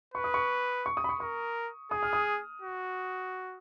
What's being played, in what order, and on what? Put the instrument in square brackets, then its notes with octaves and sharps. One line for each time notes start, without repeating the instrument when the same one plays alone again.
[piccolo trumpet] B4 [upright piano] C#6
[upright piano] D#6
C#6
C#6
D#6
B5
C#6
[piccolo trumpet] A#4 [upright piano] C#6
[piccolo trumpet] G#4 [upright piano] D#6
[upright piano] F6
D#6
[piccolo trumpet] F#4